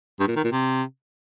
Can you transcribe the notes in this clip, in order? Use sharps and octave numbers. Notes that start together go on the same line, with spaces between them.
G2
A#2
D#3
A#2
C3